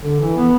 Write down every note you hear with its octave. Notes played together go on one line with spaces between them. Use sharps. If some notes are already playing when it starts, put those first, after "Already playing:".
D3
E3
B3